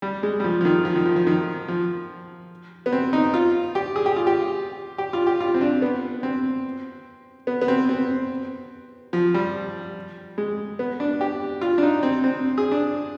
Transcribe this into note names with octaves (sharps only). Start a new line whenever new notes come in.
G3
G#3
G3
F3
F3
D#3
F3
D#3
F3
F3
D#3
F3
B3
C4
D#4
F4
G4
G#4
G4
F4
G4
G4
F4
G4
F4
C4
D4
B3
C4
B3
B3
C4
C4
F3
G3
G#3
B3
D4
G4
F4
D4
D#4
C4
C4
G#4
D4